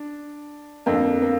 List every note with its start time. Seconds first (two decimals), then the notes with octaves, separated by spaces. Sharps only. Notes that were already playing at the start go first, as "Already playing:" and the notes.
Already playing: D4
0.86 F2 D3 A#3
1.21 A#3